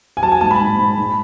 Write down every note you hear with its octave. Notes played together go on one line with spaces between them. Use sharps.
G#5
F#3 A5
G#5
G#2 A5
B5
G#2
G#2
G#2